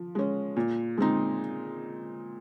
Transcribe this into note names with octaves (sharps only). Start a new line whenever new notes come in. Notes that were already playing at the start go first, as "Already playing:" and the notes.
Already playing: F3
G#3 C#4
A#2
G#3 C4 D#4